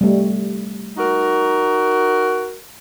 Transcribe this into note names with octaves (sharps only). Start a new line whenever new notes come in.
G3 A3
D#4 F#4 A#4